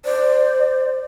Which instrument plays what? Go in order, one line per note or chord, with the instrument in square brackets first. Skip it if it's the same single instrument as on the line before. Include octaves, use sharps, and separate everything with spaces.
[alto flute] C5 [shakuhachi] D5